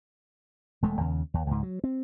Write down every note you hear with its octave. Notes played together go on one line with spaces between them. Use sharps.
E1 G#3 A3
D#2 C#3
D#2
C#2 G#2
F#3
C4